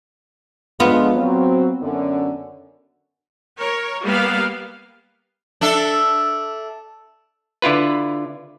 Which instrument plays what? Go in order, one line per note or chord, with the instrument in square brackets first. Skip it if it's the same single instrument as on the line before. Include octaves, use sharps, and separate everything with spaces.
[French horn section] D3 F3 G#3 [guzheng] B3 F4
[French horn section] F#3 C4
F#2 D3 C#4
[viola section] A#4 C#5
G3 A#3 B3 F5
[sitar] D4 A4 E5
[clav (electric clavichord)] D3 E4 F4 B4